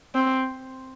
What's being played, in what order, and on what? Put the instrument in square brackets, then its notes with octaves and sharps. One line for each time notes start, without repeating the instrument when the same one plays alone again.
[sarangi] C4